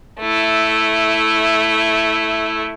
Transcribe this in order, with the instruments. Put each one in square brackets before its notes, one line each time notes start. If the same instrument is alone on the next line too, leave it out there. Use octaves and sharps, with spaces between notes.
[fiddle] A3 E4